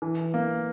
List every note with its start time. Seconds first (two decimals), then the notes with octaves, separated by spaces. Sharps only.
0.02 E3
0.34 A#3